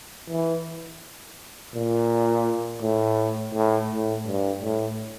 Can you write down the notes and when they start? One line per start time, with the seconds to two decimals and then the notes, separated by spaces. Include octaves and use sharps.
0.29 E3
1.74 A#2
2.81 A2
3.53 A2
3.90 A2
4.26 G2
4.62 A2